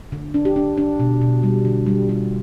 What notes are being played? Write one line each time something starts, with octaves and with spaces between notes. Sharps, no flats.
D3
D4
G4
D4
D4
B2
B2
G3
D3
G3
G3 F4